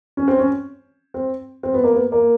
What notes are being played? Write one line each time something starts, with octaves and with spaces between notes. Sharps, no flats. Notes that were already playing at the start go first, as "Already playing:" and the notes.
C#4
C4
C#4
C4
C4
B3
A#3
B3
A#3